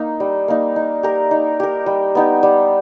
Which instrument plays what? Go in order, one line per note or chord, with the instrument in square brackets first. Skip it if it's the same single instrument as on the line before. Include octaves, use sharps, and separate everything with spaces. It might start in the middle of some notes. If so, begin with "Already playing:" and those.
Already playing: [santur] A#3 D#4
G3
A#3 D#4
D#4
G4 A#4
D#4
G4 A#4
G3
B3 D#4 G4
G3